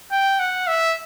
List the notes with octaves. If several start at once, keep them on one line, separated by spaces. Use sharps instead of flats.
G5
F#5
E5